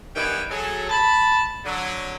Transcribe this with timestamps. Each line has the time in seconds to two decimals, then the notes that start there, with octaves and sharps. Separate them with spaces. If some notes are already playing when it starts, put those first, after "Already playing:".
0.16 G2 D#3 E3 B3 C#4 G5
0.50 F#3 G#4 A4
0.90 A5 B5
1.65 D3 F#3